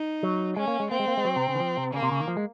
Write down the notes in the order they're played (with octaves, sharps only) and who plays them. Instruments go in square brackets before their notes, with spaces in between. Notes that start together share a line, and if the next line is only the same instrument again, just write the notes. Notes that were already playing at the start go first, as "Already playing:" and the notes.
Already playing: [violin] D#4
[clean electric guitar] F#3
[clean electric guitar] G#3 [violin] C#4
[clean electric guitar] A#3
G#3
[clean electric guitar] A#3 [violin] C4
[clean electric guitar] G#3
A#3
G#3
F#3
C3
C#3
D#3
F3
C3
[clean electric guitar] C#3 [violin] A#3
[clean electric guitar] C3
C#3
D#3
F3
G#3